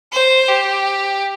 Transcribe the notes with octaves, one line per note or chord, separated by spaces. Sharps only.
C5
G4